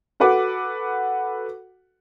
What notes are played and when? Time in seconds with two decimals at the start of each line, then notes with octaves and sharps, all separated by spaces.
0.20 F#4 A4 B4 F#5 D6